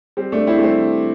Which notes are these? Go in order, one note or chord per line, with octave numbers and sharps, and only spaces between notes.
G3 C4
A3 D4
C4 E4
A3
G3 C4